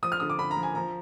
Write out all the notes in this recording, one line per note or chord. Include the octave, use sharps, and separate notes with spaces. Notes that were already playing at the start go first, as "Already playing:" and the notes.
F3 D#6
F6
D3 D#6
D6
D3 B5
A#5
F3
G#5
F3 A#5